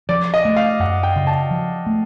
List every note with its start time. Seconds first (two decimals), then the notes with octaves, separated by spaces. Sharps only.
0.09 F3 D5
0.34 D#5
0.45 A3
0.56 F5
0.80 F#2 F#5
1.03 G5
1.16 C#3
1.27 A5
1.51 F3
1.86 A3